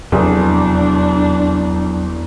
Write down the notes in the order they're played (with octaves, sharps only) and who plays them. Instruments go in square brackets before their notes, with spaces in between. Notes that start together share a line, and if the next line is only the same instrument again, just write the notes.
[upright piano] F1 G#4 [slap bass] E2 [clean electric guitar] F#3 [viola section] D4